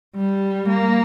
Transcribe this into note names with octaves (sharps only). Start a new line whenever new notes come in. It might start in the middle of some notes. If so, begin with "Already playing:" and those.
G3
A#3